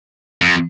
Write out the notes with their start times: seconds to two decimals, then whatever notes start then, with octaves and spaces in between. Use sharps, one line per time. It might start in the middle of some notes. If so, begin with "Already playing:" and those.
0.42 F2